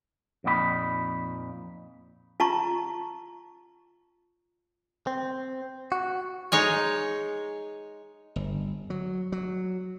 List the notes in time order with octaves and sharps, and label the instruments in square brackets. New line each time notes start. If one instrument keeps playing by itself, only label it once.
[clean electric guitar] F2 A#2 D#4 F#4 B5
[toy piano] F4 A5 A#5 C#6
[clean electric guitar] C4
F#4
[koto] G#3 D#4 C#5 G#5
[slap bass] G1
F#3
F#3